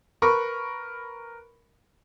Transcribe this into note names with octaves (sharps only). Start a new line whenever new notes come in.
A#4 B4 B5 C#6